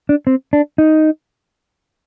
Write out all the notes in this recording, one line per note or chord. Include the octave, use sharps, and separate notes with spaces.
D4
C4
D4
D#4